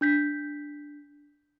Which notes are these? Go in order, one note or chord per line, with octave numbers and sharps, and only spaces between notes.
D4 G6 B6